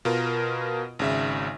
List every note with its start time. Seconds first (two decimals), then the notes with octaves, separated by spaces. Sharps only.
0.05 B2 F4 A#4
0.99 G#1 C#3 E5